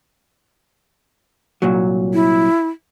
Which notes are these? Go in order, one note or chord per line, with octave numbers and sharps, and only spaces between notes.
C2 A#2 F#3
E4